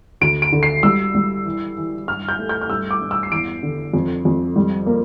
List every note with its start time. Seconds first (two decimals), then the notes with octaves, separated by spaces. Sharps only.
0.21 D2 D7
0.42 D7
0.52 D3
0.63 C7
0.83 G3 E6
1.15 G3
1.46 E3
1.77 E3
2.07 G2 F6
2.29 G6
2.39 A3
2.49 G6
2.62 F6
2.69 G2 E6
2.91 D6
3.01 G2
3.11 E6
3.23 C7
3.31 E2 D7
3.63 D3
3.93 F2
4.25 F2
4.56 G3
4.86 A#3